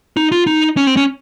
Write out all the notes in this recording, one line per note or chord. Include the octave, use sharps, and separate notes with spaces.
D#4
F4
D#4
C#4
C4
C#4